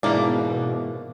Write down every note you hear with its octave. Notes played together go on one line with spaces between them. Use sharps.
G#2 B2 E3 A#3 D4